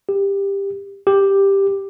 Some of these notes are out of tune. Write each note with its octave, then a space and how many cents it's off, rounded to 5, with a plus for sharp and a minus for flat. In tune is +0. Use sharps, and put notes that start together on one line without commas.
G4 +15
G4 +5